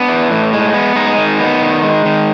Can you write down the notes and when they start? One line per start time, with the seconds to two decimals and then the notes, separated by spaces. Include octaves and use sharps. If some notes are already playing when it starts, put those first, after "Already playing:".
Already playing: B3 D4
0.09 E3
0.31 A2
0.53 G#3
0.74 B3
0.96 G#3 D#4
1.18 D#3
1.40 B3
1.62 D#3
1.83 G#3
2.05 D#3